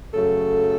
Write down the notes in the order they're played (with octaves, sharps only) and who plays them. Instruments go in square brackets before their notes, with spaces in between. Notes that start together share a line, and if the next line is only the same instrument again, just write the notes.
[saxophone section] F#2 C#3 F#3 A3 A4